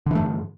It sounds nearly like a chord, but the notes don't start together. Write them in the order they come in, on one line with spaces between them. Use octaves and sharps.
D3 E3 A3 G2